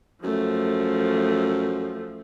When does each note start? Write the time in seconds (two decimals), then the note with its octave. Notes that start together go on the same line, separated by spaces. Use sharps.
0.24 F#2 F3 A3